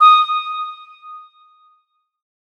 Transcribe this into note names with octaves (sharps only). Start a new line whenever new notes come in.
D#6